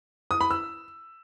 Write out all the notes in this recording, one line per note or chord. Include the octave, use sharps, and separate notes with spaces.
D#6
B5
E6